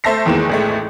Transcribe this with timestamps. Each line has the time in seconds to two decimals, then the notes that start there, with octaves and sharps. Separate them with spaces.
0.04 A3 C5 E5 A5 A#6 C7
0.26 E2 D#3 E3 G#3 A#3 E7
0.50 A1 G#3 A3